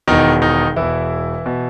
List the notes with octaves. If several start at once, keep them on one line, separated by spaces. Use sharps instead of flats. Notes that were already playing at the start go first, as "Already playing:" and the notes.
E1 E2 B2 D#3 D#4
D#3 D#4
E1 E2 B2 E3 E4
B2